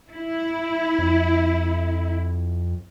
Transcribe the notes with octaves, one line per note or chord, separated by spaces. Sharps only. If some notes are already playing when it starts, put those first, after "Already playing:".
E4
F2